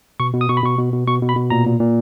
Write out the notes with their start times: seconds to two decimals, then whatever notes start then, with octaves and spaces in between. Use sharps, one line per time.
0.20 B2 C#6
0.34 B2
0.41 D#6
0.49 B2 C#6
0.57 B5
0.63 B2 C#6
0.78 B2
0.92 B2
1.07 B2 C#6
1.22 B2
1.29 B5
1.36 B2
1.50 A#2 A#5
1.66 A#2
1.80 A#2